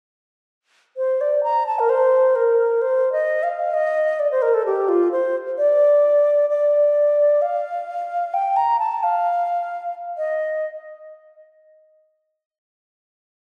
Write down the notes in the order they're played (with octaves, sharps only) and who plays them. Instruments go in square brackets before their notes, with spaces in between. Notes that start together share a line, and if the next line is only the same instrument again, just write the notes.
[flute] C5
D5
A#5
A5
A#4
C5
A#4
C5
D#5
F5
D#5
D5
C5
A#4
A4
G4
F4
C5
D5
D5
F5
G5
A#5
A5
F5
D#5